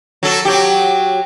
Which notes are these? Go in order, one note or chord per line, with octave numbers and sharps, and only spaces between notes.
F#3 A4
F#3 G4